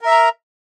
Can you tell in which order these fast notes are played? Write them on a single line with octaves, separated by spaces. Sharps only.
A#4 E5 A#5